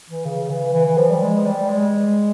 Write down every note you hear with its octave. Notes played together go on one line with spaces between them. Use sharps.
E3
C#3
E3
E3
E3
F3
G3
G#3
G3
G#3